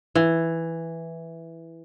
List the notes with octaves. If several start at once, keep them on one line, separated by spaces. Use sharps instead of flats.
E3